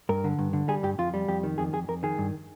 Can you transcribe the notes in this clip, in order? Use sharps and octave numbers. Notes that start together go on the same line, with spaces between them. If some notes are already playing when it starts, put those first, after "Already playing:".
G2 A#4
D3
G2
D3
G3 G#4
G2 G4
F2 F4
G3
F2 G4
D#3
F2 G#4
F2 G#4
F2 A#4
D#3 G#4
G2